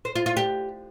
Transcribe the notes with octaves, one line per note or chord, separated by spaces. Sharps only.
C5
F4
F4
G4